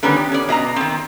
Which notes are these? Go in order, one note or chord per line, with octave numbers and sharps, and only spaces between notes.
D3 D#3 G3 B3 C#4 D#4
G4
C#4 D5
B2 D#5 F#5 A#5
D#3 C4